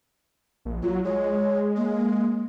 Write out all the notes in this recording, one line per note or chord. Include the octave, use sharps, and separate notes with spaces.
A#1
F#3 F4
G#3 C#5
A#3